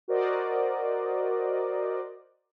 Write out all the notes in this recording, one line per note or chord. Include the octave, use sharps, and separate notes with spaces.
F#4 A#4 C5 D5 D#5